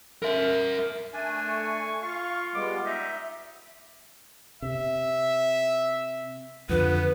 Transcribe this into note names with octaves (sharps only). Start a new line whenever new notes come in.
A#4 E5
A3 D4 G#5
C#6
F4 F5 C#6
G3 G#3 B3 D6
D#4 E5
C3 E5
F2 D3 F3 B3 B4